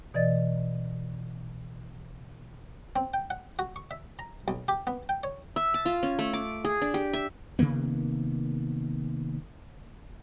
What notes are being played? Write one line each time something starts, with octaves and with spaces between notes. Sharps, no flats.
B2 E3 D5 D#5 A6
C4
G5
F#5
F#4
C#6
E5
A#5
B1
G4
B3
G5
C#5
E5
A5
F4
C#4
A3
D6
G#4
D4
G4
E5
C3 D#3 A#3 B3